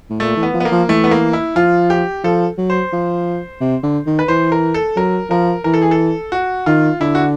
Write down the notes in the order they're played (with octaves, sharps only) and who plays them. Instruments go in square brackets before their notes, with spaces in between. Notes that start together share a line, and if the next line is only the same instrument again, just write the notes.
[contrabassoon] A2
[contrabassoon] A#2 [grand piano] A3
[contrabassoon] E3
[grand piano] B3
[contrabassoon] F3
[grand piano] B3
A#3
[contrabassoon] F3
[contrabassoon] E3 [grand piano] A3
[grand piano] B3
A#3
E4
[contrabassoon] F3 [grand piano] F4
[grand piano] G4
[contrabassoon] F3 [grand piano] A4
[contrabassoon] F#3
[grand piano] C5
[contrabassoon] F3
C3
D3
D#3
[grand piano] B4
[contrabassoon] E3 [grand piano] C5
[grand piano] A#4
A4
[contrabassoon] F#3 [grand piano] A#4
[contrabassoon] F3 [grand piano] A#4
[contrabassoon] E3 [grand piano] A#4
[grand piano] A4
G#4
A4
F#4
[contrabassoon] D#3 [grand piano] F4
[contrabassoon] D3 [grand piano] E4
[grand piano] F#4